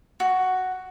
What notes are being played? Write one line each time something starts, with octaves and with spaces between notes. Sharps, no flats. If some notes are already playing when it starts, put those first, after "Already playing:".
F#4